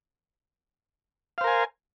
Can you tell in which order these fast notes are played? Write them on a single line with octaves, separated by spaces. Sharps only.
F5 C5 A#4 G#5